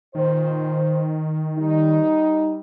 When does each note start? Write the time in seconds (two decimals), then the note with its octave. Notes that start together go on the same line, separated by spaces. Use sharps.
0.15 A#2 D#3 C5
1.58 G3 D#4